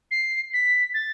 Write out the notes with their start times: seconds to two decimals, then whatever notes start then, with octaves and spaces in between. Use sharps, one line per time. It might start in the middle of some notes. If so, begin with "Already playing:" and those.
0.11 C7
0.54 B6
0.94 A6